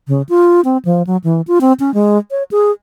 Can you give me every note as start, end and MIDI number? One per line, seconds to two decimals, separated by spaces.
0.08 0.22 49
0.29 0.61 65
0.65 0.77 60
0.85 1.03 53
1.07 1.17 54
1.24 1.41 52
1.47 1.59 65
1.61 1.73 60
1.80 1.93 61
1.94 2.18 56
2.31 2.43 73
2.51 2.72 68